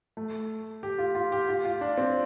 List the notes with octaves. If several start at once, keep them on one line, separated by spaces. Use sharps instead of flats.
A3
G4
F4
F4
G4
F4
F4
D4
C4